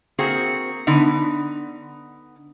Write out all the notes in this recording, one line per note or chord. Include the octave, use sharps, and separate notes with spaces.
A#3 C4 F#4 G#4
D3 B3 D#4